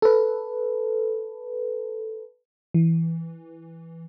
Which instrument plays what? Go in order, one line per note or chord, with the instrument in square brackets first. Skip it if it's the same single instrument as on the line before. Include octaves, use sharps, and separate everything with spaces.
[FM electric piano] A4 B4
E3